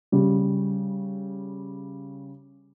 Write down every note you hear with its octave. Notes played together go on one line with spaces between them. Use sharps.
C#3 G3